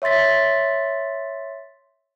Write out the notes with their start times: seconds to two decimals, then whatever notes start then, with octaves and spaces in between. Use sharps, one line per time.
0.02 C#5 E5 C6 A6 B6